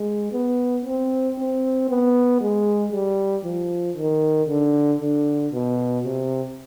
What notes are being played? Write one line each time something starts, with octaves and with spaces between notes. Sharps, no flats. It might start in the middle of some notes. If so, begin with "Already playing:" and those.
Already playing: G#3
B3
C4
C4
B3
G#3
G3
F3
D#3
D3
D3
B2
C3